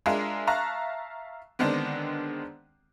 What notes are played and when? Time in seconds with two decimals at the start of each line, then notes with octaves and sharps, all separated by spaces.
0.06 G#3 D4 F4 G#4 A#4 E5
0.47 E5 F5 A5 A#5 C#6 F#6
1.59 D3 D#3 G#3 B3 C4 D4